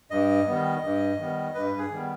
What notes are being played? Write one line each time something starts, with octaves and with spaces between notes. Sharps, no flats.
G2 D#5
D#3 G3 B3
G2
D#3 G3 B3
G2 B4
G#4
D#3 G3 B3